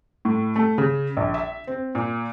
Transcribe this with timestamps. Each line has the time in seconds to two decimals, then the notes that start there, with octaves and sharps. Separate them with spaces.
0.25 A2
0.56 A3
0.78 C#3
1.17 A#1
1.34 E5
1.67 C4
1.95 A#2